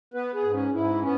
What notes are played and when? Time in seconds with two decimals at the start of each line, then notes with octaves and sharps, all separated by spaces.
0.14 B3 B4
0.34 G#4
0.44 G#2
0.53 C#4
0.73 G#2 E4
1.02 B3 C#4